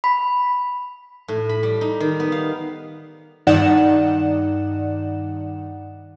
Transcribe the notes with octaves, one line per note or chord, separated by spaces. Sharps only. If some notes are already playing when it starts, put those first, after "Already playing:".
B5
A2
B5
G3
D#4
D#3
B3
F5
G2 D#3 D#4 D5 F#5 E7